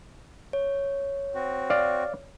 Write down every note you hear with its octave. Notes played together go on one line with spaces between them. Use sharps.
C#5
C4 F#4
D5 F5